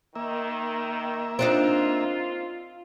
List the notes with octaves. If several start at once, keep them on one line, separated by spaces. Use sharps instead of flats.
D#3 A#3 E5
C4 D4 D#4 F4